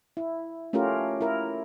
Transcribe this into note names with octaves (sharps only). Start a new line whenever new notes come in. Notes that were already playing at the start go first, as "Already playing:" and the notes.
E4
A3 C#4 F4 G4 A#4
E4 A#4